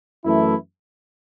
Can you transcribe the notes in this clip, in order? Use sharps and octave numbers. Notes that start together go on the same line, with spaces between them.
F#2 E3 A3 E4